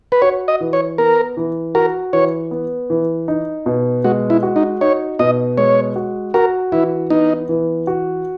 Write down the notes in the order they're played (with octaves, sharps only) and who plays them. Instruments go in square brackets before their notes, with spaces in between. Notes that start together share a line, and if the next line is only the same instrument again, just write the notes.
[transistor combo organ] B4
[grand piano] F#4 [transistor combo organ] C#5
[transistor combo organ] D#5
[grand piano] E3
[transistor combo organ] C#5
[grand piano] B3 [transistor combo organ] A#4
[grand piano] E3
[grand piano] F#4 [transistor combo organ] A#4
[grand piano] E3 [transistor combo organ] C#5
[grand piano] B3
E3
D#4
B2
[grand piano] G#3 [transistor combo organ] F#4
[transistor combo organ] E4
[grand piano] F#4
[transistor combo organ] D#4
[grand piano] D#4 [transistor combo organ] C#5
[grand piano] B2 [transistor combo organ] D#5
[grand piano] G#3 [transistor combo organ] C#5
[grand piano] F#4
[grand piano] F#4 [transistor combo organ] A#4
[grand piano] E3 [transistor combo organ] E4
[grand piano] B3 [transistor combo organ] D#4
[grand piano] E3
F#4